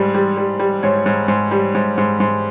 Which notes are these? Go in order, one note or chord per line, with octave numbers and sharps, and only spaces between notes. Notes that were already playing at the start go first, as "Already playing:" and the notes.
Already playing: G#2 G3
G3
G3
G3
G#2 C#5
G#2
G#2
G3
G#2
G#2
G#2